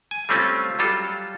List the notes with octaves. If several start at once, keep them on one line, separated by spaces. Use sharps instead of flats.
G#5
G3 A3 C4 C#4 F4
F#3 G3 F4 A4